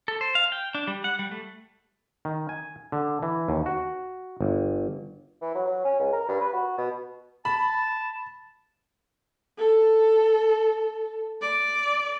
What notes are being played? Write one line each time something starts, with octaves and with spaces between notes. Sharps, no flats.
A4
C5
F5
G5
D4
G3
F#5
G3
A3
D#3
G#5
D3
E3
D#2
F#4
G1
E3
F#3
F#3
C#4
C#2
A#4
G2
B4
F#4
B2
A5 B5
A4
D5